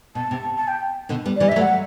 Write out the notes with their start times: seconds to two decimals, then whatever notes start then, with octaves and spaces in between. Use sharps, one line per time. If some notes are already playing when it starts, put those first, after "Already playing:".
0.15 B2 A5
0.31 C3
0.57 A5
0.68 G5
1.09 B2 D3
1.26 G3 B3
1.36 E3 G3 D5
1.48 G3 E5
1.56 F#3 A3
1.60 F#5